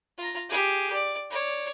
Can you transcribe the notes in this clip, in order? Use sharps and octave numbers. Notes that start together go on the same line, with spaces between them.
F4 A#5
G4 G#4
D5
C#5 D5